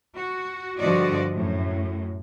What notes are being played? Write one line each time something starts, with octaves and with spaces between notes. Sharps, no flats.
F#4
G2 D3 F3 F#4 D5 D#5
F#2 A2